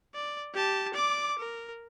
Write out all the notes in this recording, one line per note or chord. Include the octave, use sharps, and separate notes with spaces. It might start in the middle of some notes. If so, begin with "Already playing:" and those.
D5
G4 A5
D5 D6
A#4